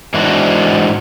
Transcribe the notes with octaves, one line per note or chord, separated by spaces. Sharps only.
G#2 E3 D4 F#4